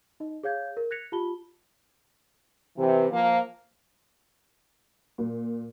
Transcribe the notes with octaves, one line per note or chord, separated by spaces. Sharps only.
D#4 D#5
G#4 C#5 F5 G6 G#6
A#4
F#6 G#6 A#6 B6 C#7 F7
F4 G4 A5 B5 G7
C3 E3
F3 A#3
A#2